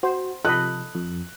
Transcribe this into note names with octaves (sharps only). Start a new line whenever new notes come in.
F#4 C5
C3 F3 A4 D#5 B5 F#6
F2